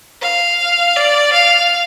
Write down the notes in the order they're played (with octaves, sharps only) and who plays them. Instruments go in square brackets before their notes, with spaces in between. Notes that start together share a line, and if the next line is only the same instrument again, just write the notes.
[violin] F5
D5
F5